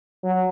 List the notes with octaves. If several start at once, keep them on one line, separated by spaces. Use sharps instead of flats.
F#3